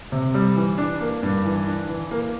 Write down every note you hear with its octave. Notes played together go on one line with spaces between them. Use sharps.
C3
G3
E3
D4
A#3
G2
E3
D4
E3
A#3